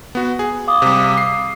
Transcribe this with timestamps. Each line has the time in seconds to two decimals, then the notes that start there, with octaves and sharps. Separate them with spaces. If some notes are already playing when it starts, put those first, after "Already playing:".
0.15 B3 F#4
0.39 G#4
0.67 F5 D6 D#6
0.82 C3 G3
1.17 C7